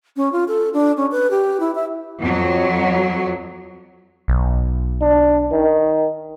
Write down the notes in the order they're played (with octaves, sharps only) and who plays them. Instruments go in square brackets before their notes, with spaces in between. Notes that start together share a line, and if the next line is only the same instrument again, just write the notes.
[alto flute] C#4
F4
A4
D4
C#4
B4
G4
E4
E5
[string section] F2 F#3
[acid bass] B1
[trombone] D4
D#3